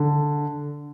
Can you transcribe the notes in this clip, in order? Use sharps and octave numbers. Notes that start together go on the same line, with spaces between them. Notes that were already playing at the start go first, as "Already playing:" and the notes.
Already playing: D3